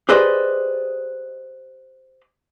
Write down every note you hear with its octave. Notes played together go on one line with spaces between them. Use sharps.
G4 G#4 B4 C5 D5 D#5